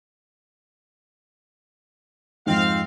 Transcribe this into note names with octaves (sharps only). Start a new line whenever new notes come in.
F2 G#2 C4 F5